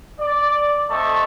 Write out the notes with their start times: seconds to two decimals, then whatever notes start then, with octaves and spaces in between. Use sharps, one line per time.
0.20 D5
0.90 A3 C4 D#5 A5 C#6